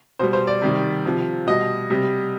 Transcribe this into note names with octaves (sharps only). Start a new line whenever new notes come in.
B2 G3 C5
C5
D5
C3 D#3 G3
C3 F3
B2 G3 D#5
C3 G3